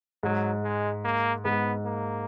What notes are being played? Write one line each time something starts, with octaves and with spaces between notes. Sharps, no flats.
G#2 F#3
G#3
A#3
G#2 B3
A#3